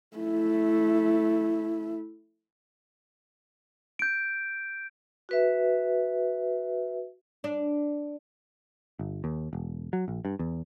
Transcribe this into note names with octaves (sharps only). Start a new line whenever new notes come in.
A3 E4
G6 D7
F#4 B4 E5
D4
G1
D#2
E1
F#3
A#1
G2
E2